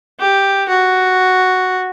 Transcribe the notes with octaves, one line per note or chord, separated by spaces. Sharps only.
G4
F#4